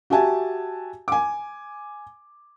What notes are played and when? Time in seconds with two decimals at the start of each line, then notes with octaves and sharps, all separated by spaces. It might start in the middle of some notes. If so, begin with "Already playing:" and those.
0.10 F#4 G4 E5 G#5 A5
1.08 G#5 D6